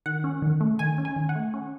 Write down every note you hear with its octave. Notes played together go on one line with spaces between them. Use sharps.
D#3 F#5
C#4
D#3
A3
D#3 G#5
C#4
G#5
D#3
F#5
A3
C#4